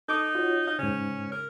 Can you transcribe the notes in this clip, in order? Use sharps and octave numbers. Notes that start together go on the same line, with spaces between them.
D#4 A4 D6 D#6
F4 F#4 C#5
D#4 F5
G#2 C#3 C#4
A#4